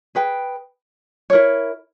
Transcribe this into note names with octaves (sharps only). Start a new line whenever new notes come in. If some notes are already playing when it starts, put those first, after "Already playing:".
G#4 B4 G5
E4 A#4 C#5